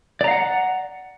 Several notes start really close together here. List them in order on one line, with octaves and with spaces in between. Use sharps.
D5 A#5 F5 F#5